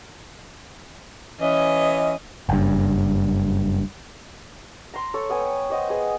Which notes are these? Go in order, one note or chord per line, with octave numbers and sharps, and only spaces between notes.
E3 C#4 D#5
F#1 G2
A#5 C6
A4 C#5
B3 G5 G#5
C5 D#5 F#5
B3 G#4